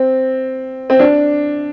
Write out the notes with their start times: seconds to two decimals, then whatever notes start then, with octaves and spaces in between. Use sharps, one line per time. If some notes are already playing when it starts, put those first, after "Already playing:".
Already playing: C4
0.90 C4
0.99 D4